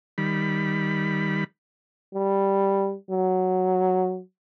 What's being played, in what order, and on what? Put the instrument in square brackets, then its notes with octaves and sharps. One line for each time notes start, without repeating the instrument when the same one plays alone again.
[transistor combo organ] D#3 G3 B5
[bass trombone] G3
F#3